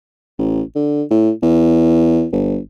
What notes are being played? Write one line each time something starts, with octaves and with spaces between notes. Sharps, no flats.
A1
D3
A2
E2
G1